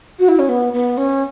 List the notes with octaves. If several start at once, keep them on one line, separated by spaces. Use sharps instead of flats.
F#4
E4
C#4
B3
B3
C#4